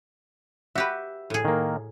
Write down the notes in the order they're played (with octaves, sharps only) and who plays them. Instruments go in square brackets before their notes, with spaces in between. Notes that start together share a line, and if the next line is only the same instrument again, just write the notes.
[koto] F#4 G4 B4 [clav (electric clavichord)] E5
[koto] A2 G#4
[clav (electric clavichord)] D#3 A#3